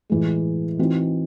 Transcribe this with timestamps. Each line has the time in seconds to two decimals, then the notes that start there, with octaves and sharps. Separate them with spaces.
0.10 A2 E3 G#3
0.79 E3 C4 D#4 F#4